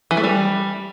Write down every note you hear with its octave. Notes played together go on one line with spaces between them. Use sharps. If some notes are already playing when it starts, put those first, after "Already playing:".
E3
A3
G3